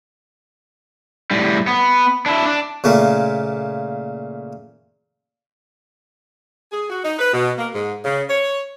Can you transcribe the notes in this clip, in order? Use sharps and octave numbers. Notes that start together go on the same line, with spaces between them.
A2 G3
B3
D4 E4
D4
A#2 C#3 A3 A#3
G#4
F#4
D#4
B4
B2
A#3
G#2
C#3
C#5